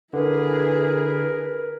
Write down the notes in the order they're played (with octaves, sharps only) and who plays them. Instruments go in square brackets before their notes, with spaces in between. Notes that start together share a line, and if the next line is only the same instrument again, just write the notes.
[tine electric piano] D3 [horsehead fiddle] E4 G#4 [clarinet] A#4 [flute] B4